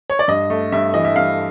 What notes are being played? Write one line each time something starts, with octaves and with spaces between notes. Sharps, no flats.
C#5
D5
G2 D#5
A3
G2 E5
E3 D#5
E5
G2 F5